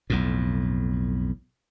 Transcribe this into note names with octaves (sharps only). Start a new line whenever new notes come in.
B1 F2 A2